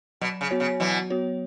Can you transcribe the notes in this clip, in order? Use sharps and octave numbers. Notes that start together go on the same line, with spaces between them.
B2 F#3
C#3
B3 F#4 C#5
C#3
B2 E3 F#3
B3 F#4 C#5